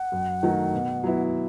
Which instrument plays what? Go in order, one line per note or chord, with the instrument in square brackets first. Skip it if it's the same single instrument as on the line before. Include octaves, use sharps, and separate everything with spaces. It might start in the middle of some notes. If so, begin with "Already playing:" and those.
Already playing: [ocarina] F#5
[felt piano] F#2
D#3 F#3 A3
B2
F#3 B3 E4